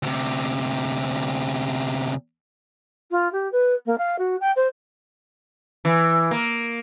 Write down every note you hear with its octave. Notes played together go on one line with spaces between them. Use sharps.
D2 C3
F4
G4
B4
A#3
F5
F#4
G5
C5
E3
A#3